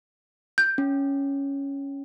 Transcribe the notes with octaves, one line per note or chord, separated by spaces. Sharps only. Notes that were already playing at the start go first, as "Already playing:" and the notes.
G6
C#4